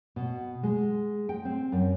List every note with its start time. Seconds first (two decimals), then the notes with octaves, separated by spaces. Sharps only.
0.16 B2
0.63 G#3
1.29 G5
1.45 C4
1.72 F#2